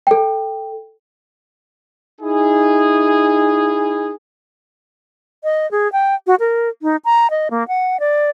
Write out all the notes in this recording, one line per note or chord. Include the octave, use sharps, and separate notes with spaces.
A4 G5
D#4 E4 G#4
D#5
G#4
G5
F#4
A#4
D#4
A#5
D#5
A#3
F#5
D5